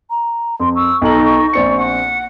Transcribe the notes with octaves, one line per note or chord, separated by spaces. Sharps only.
A#5
F2 C6
C#6 E6
B1 D#4 A4 F#7
A#1 C4 D5 C#7
F#5